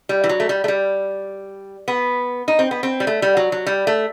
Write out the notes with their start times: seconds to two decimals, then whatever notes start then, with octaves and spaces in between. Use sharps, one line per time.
0.09 G3
0.24 E3
0.29 F#3
0.40 A3
0.49 G3
0.64 A3
0.68 G3
1.88 B3
2.48 D#4
2.59 C4
2.71 B3
2.83 C4
3.00 G3
3.07 A3
3.22 G3
3.37 F#3
3.52 F#3
3.67 G3
3.87 A3